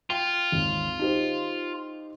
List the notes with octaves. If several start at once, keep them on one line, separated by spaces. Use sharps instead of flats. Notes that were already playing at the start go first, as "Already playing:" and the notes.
F4 G5
G#1 D#2
D#4 G4 C5